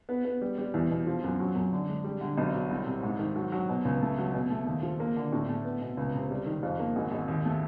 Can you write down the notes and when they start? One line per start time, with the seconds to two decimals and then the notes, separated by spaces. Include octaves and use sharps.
0.09 B3
0.25 B3
0.41 G3
0.58 G3
0.74 E2
0.91 B2
1.07 F3
1.24 F#2
1.40 F#3
1.56 F#2
1.72 D3
1.89 G#3
2.04 G3
2.21 D3
2.37 B1
2.54 F#3
2.70 C2
2.86 C3
3.03 G#2
3.19 D#3
3.36 F#3
3.52 F#3
3.69 B2
3.85 C#2
4.02 A3
4.18 F#3
4.34 B2
4.50 A3
4.67 D#2
4.83 F3
5.00 A#3
5.16 D3
5.32 A2
5.49 A3
5.65 B3
5.82 B2
5.97 C#2
6.14 C3
6.31 G3
6.46 D#3
6.63 F2
6.79 A#3
6.96 G#1
7.12 G#1
7.28 D#2
7.45 A3